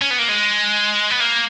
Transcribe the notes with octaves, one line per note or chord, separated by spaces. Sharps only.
C#4
B3
A#3
G#3
B3
A#3